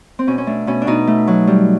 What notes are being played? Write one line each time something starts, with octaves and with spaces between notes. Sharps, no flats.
C4
B2 C#4
C#4
A3 D4
B2 C#4
D4
B2 D#4
A3
F#3
G3